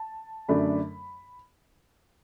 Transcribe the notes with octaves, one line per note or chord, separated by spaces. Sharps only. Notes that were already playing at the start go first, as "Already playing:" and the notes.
Already playing: A5
F#2 D3 F#3 A3 D4 B5